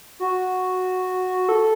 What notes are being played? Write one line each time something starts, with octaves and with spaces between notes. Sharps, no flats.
F#4
A4